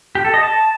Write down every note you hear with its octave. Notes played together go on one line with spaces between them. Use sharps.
G4
A4
D#5
A5